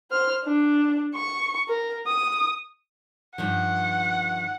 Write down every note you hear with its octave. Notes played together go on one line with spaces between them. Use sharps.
C5 F6
D4
C#6
A#4
D#6
G2 D#3 F3 F#5